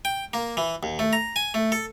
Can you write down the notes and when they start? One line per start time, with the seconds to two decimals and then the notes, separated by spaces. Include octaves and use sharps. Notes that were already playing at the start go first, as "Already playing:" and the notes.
0.05 G5
0.34 A#3
0.57 E3
0.83 D#2
0.99 A3
1.13 A#5
1.36 G#5
1.54 A3
1.72 A4